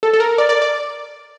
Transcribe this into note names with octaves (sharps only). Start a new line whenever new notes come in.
A4
A4
A#4
D5
D5
D5